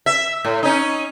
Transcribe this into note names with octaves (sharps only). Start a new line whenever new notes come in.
E5
A2
C#4 D#4